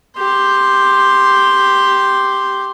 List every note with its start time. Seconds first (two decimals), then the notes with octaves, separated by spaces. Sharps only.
0.17 G4 C6